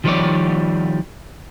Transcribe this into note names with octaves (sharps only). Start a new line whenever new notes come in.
D#3 F3 G3 B4 C#5 D5